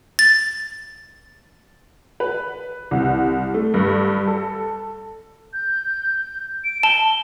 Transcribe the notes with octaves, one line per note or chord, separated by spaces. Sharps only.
A6
B4
C2
A3
G2
A4
G6
D7
A5 G7